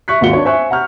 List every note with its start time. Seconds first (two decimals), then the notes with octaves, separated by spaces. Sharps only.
0.08 E5 C#6 F#6 B6
0.21 G#1 D#2 F4 F#4 C#7 G7
0.33 D4 C#5
0.45 C5 E5 G#5 C#6 F#6
0.71 F#5 A#5 C#6 F6 G6